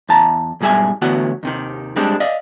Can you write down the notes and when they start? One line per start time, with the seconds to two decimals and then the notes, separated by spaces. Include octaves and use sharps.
0.09 E2 A5 A#5
0.60 B1 G#2 G3 G#4 E5 G#5
1.02 A2 D3 E3 B3 F#4 F#5
1.43 D#2 C3 D#3
1.96 G3 G#3 C4 D4
2.20 D5 D#5 F5